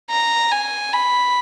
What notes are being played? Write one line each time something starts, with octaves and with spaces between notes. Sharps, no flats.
A#5
G#5
B5